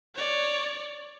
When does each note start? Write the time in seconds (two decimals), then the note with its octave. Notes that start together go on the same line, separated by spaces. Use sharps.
0.15 C#5 D5